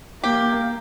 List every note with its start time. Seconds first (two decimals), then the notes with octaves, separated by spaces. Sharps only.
0.23 A#3 G4